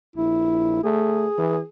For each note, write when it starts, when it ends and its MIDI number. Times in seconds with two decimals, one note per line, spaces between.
0.16 0.82 34
0.16 0.83 64
0.84 1.26 57
0.84 1.65 68
1.38 1.60 52